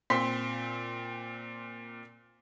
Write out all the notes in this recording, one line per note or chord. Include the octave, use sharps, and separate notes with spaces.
A#2 C4 C6 B6